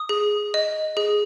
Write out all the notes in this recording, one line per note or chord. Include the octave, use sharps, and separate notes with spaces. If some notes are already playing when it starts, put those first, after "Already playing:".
Already playing: D#6
G#4
D#5
G#4